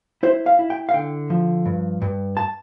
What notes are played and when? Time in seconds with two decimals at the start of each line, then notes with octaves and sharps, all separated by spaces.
0.23 E4 C5
0.46 F5
0.59 E4
0.70 G5
0.89 F5
0.94 D3 G5
1.30 F3
1.66 G2
2.02 G2
2.37 A5